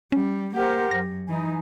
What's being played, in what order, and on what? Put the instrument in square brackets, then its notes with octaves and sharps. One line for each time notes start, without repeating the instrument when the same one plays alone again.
[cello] G3 [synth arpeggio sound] C#4
[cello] A#3 G4 [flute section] A#4 C5 F#5
[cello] F#2 [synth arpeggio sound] A#6
[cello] E3 [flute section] D#4 G#5